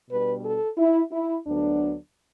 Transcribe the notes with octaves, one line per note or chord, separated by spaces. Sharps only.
B2 G3 D4 B4
A4
E4
E4
D2 D3 F#3 B3 D4